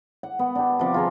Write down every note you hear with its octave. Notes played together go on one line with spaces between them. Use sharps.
F#5
B3
D4 G4
C3 F3 D6
F4 G#4 A#5